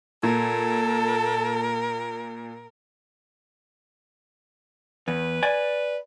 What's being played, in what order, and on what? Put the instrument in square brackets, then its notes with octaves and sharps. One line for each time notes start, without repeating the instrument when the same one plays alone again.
[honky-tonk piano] A#2 [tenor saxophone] A4 [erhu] A#4
[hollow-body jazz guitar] E2 [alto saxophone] B4
[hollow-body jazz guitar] D5 G#5